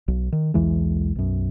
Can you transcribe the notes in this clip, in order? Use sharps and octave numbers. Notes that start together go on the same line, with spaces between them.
B1
D#3
B1 E2 E3 G#3
B1 F#2